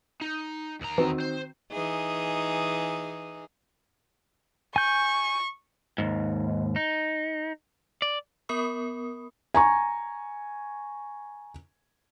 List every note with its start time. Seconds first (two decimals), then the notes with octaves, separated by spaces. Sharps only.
0.21 D#4
0.81 D#2 A#5
0.98 D#3 E3 C4 F#4
1.20 C5
1.72 E3 D#4 G#4
4.76 G#5 C#6 G6
5.98 D#2 G#2
6.76 D#4
8.02 D5
8.49 B3 A#4 B5 D#6
9.54 G#5 A#5 C#6